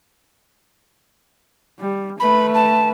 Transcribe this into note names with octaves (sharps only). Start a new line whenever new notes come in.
G3
A3 B4 B5
A5